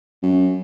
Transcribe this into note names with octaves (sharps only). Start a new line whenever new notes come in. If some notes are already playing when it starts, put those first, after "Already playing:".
F#2